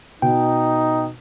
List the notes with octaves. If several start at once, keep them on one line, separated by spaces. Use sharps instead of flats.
B2 D#4 G5